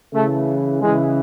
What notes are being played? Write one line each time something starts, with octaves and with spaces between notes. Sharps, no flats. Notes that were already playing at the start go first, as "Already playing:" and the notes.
C#3 E3 A3
C#3 E3 G#3